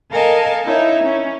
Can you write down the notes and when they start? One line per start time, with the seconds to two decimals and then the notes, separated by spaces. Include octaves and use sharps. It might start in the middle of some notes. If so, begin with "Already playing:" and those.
0.10 A4 A#4 D#5 F5 G#5 A5
0.64 D#4 E4 C#5 E5
1.03 C#4